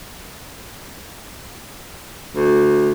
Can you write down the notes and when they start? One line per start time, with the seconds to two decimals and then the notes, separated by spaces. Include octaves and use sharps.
2.35 D2